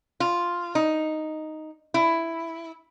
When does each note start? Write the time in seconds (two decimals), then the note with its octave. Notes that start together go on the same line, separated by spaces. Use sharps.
0.20 F4
0.75 D#4
1.94 E4